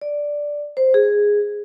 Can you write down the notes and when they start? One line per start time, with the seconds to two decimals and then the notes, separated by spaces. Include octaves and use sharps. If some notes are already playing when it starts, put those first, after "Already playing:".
0.01 D5
0.77 C5
0.94 G#4